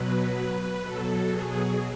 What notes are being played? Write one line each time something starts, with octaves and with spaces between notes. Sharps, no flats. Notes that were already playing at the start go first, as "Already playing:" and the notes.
Already playing: B2 F#3 B4
B2 F#3 A4
G#4